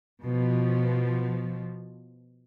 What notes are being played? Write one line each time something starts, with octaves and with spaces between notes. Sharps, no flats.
B2 F3